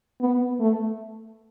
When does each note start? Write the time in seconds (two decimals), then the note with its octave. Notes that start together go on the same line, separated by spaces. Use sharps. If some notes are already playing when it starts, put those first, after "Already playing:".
0.21 B3
0.60 A3